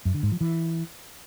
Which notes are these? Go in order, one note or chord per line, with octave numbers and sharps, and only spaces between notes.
F#2
D3
G#2
F3
E3